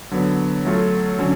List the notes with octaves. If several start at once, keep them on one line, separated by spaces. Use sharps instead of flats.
D3 F#3 B3
F#3 A3 F4 A4
D3 F#3 C#4